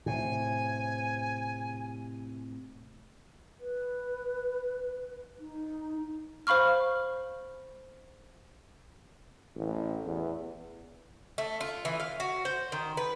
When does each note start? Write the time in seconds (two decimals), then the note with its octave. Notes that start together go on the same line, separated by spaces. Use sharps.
0.06 A2 C3 G#5
3.60 B4
5.40 D#4
6.47 C5 F5 B5 C#6 F6
9.56 A1
10.06 E2
11.38 A3
11.61 F4
11.85 E3
12.00 F5
12.20 F#4
12.45 C5
12.72 D#3
12.97 B4